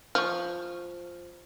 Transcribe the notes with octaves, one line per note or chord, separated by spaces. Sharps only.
F3 C#6 F6